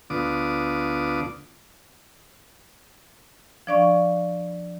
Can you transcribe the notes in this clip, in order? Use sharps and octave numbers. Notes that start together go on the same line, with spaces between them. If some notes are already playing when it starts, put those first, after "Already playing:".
D2 D3 B3 F4 D6 D#6
F3 D4 D5 F5 C#6